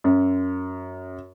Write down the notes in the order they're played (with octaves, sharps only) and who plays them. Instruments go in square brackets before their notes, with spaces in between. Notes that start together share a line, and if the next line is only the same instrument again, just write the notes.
[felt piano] F#2